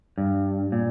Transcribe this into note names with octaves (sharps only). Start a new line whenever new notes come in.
G2
A#2